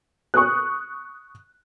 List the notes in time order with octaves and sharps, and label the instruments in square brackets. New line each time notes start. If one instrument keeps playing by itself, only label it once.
[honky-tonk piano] C#6 D#6 F#6